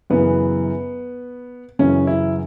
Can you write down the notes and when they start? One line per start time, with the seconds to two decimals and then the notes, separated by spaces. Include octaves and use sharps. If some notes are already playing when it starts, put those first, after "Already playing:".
0.10 F#2 C#3 E3 B3
1.79 F#2 C#3 E3 C#4
2.07 E4